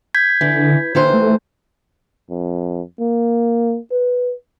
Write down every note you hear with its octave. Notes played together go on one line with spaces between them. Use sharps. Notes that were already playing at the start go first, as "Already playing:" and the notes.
G6 G#6 B6
D3 E3
D#2 D3 E3 C5
A3
F2
A#3
B4